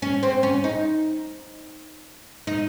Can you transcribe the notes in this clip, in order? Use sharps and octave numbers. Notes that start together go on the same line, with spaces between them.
C#4
C4
C#4
D#4
D#4